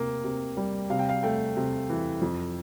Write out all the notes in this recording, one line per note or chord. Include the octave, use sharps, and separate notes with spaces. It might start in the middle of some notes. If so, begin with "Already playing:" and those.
Already playing: C3 A#3
C3
G3
C3 F5
G5
F5
A3 G5
C3
E3
F2